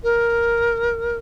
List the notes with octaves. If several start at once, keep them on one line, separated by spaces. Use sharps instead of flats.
A#4